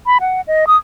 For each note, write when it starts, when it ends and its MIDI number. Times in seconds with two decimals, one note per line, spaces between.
0.06 0.18 83
0.21 0.41 78
0.47 0.65 75
0.67 0.77 87